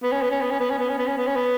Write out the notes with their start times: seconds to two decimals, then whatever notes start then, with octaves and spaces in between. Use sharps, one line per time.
0.03 B3
0.12 C#4
0.22 B3
0.31 C#4
0.41 B3
0.51 C#4
0.60 B3
0.70 C#4
0.79 B3
0.89 C#4
0.98 B3
1.07 C#4
1.17 B3
1.27 C#4
1.36 B3